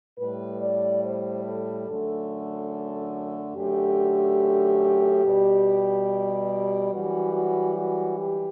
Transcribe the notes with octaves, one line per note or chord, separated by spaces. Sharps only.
A2 G3 B4
D5
C5
A4
F#2 D3 A3
F#2 D3 A3 G4
B2 G3
F#2 E3 G3 F#4
F#4
F#4
G4